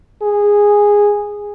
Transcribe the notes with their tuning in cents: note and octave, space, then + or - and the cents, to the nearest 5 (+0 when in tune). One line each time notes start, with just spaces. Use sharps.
G#4 -10